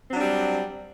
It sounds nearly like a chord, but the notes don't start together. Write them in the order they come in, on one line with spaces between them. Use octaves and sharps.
C4 F#3 D4 G3